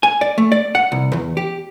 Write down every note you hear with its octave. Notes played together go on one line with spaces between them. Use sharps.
G#5
D5
A3
D5
F#5
C2
E2
G4